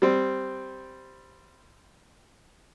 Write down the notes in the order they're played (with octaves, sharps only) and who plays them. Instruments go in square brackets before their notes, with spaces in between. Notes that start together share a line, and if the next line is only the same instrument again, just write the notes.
[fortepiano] G3 C4